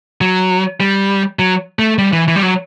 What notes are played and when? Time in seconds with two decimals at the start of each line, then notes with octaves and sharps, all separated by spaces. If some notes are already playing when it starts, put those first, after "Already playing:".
0.21 F#3
0.80 G3
1.39 F#3
1.79 A3
1.98 G3
2.13 E3
2.28 E3
2.36 G3
2.43 F#3